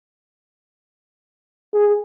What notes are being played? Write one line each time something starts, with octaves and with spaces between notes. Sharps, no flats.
G#4